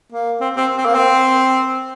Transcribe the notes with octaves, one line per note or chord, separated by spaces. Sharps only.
A#3
C4
C4
C4
A#3
C4